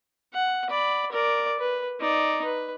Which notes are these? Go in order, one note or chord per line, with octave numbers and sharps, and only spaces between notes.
F#5
D5 B5
A#4 D5
B4
D#4 D5
B4